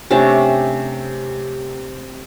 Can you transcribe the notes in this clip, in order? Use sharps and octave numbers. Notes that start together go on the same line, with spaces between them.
C3 A3 C#4 D4